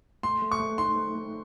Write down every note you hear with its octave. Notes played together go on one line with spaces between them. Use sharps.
A3 C6
A3
C#6
A3
D#4 C6
A3
A3